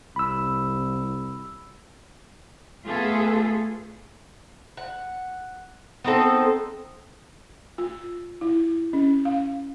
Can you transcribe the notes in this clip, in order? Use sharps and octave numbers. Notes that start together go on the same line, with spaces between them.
C2 B5 E6
A3 B3 F4 G#4 A4
F#5
B3 C4 D#4 A4
F4
E4
C#4
F5